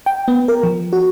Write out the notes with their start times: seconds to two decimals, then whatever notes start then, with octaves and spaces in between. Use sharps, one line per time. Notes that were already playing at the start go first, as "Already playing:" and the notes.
0.06 G5
0.28 B3
0.48 A#4
0.63 F3
0.93 F#4